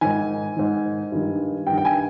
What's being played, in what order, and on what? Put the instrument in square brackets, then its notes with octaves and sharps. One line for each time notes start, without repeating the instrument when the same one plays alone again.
[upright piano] G#2 D#3 G#5
G#2 D#3
G2 D#3
G2 D#3 G5
G5
G#5